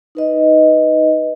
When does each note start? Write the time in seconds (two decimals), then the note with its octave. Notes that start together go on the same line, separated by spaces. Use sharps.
0.15 D#4 B4 D#5